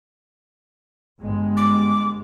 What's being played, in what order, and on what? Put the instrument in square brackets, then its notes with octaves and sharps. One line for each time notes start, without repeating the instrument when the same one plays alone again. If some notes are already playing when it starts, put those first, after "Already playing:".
[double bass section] G1 G#3
[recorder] D6